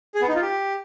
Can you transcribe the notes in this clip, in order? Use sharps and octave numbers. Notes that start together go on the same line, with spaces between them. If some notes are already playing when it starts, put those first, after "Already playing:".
G#4
B3
D#4
F4
G4